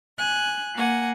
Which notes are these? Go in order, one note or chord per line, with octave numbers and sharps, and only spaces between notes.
G#5 F#6
A#3 F#5 G#5